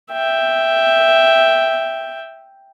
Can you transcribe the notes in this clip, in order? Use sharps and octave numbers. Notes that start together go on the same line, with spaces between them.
E5 G5